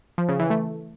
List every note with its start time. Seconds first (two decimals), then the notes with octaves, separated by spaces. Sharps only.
0.18 F3
0.29 C#3
0.39 E3
0.50 A3